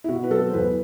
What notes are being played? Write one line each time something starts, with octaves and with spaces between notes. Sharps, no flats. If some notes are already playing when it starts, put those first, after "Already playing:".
E4
B2 F#4
B4
F#3 A4
C5
E2 B4
B4